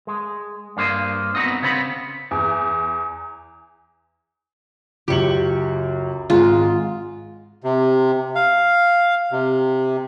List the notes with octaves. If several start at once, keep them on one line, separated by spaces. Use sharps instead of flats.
G#3
G2 A#3 C5 D#5
B3 C4 D#4 F#4 D#5
C#3 B3 C4 B5
E2
C#2 F#2 G4 C#6 F#7
G#1 G#2 G#3 F4
C3
F5
C3